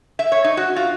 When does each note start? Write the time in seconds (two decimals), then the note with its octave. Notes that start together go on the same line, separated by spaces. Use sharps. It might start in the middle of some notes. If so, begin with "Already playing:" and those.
0.19 E5
0.32 C#5
0.44 D#4
0.57 F#4
0.76 F4